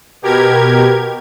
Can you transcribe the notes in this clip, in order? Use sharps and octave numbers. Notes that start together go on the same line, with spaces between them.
B2 G4 A#4 G#6